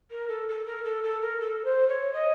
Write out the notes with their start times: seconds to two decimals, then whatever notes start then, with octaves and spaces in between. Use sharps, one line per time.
0.11 A#4
0.29 A4
0.48 A4
0.66 A#4
0.84 A4
1.03 A4
1.22 A#4
1.40 A4
1.65 C5
1.89 C#5
2.14 D#5